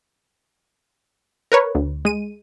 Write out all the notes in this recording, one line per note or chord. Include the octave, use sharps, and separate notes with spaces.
A#4 B4 C#5
D2
G#3 D#7